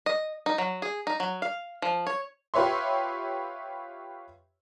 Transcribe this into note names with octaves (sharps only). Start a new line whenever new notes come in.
D#5
D#4
F#3
G#4
D#4
F#3
F5
F3
C#5
F4 G4 B4 C#5 E5 C6